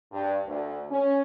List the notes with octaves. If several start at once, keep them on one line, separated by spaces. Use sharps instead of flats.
G2
D2
C#4